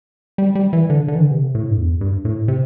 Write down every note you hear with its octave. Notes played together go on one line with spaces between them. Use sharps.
G3
G3
E3
D3
D3
E3
D3
C3
A2
G2
E2
G2
A2
C3